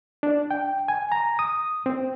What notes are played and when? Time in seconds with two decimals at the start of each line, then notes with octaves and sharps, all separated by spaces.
0.23 D4
0.51 G5
0.88 G#5
1.12 A#5
1.39 D#6
1.86 C4